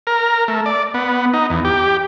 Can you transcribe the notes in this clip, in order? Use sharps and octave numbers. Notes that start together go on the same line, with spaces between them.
A#4
A3
D5
B3
D#4
E2
G4